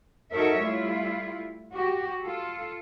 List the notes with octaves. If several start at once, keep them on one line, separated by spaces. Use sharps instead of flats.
D#4 F#4 A4 A#4 C#5 E5
G3 A3 E4 F4
F#4 G4
F4 A4